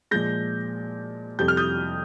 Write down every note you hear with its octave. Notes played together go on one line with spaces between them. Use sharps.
A#2 F3 G#3 G6 A#6
F2 C3 G3 G6
F6
D#6 G6